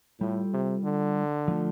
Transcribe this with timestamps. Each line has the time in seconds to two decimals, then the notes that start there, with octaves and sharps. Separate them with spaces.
0.20 A2 G3 F4 A4
0.53 C3
0.84 D3
1.48 F3 A3 F4